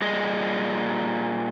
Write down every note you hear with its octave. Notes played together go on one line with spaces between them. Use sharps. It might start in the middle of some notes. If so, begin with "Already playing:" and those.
A#2 G3 G#4 D#5